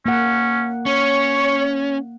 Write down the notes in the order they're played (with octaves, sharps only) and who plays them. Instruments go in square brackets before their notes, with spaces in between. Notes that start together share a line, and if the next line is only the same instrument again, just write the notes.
[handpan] A#3 F#5 [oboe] C#4
[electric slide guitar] C#4 [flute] C#5 [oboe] C#6